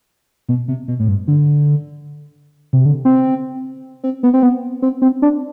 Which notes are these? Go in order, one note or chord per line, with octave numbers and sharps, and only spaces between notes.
B2
C3
B2
A2
G2
D3
C3
D3
C4
C4
B3
C4
B3
C4
C4
D4